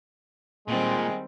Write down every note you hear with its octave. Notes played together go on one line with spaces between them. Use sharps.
A#2 D#3 G3 G#3 C4